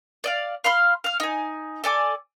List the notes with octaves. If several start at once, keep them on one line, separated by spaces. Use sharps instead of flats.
D5 D#5 F5
F5 B5 C6 F6
F5 F6
D#4 G#5
A4 D5 G#5 D6